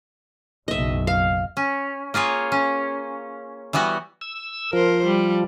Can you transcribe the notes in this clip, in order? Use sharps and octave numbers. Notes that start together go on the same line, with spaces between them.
F#1 B1 D#5 E5
F5
C#4
A#3 F4 G#4 C#5
C#4
E3 G3 B3 F#4
E6
F3 A#4 C5
G3